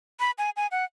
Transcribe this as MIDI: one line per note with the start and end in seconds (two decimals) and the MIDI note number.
0.20 0.31 83
0.38 0.50 80
0.56 0.67 80
0.71 0.84 78